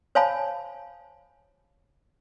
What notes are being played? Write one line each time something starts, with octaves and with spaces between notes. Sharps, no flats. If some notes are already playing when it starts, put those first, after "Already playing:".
C5 C#5 F5 G#5 A5 B5